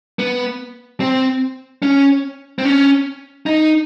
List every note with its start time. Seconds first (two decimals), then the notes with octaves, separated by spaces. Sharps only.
0.19 B3
1.00 C4
1.82 C#4
2.59 C4
2.64 C#4
3.46 D#4